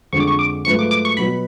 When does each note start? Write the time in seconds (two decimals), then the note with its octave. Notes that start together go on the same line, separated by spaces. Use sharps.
0.13 F2 D3 G#3 C#6
0.20 D6
0.27 C#6
0.39 D6
0.65 G#2 F#3 A3 F4 B4 C#6
0.79 D6
0.91 D6
1.05 C#6
1.17 B2 F#3 B3 B5